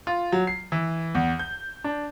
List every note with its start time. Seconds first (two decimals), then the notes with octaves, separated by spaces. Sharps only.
0.07 F4
0.32 F#3
0.47 C7
0.72 E3
1.15 E2
1.39 G6
1.84 D4